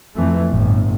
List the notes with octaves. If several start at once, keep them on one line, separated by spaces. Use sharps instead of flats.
F2 E3 A3
G1 A2